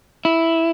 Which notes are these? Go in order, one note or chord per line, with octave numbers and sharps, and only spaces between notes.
E4